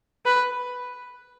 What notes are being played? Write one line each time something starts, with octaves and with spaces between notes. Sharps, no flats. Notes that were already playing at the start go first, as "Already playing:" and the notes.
B4